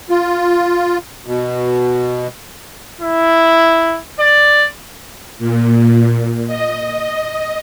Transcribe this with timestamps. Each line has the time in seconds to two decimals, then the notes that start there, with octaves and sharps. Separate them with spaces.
0.10 F4
1.27 B2
3.01 E4
4.20 D5
5.38 A#2
6.47 D#5